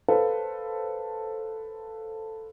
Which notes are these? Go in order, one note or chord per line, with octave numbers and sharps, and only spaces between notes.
A4 B4 C5 F5